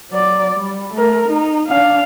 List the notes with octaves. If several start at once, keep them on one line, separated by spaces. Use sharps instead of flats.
F#3 D5
G3
A3 A#4
D#4
D4 F5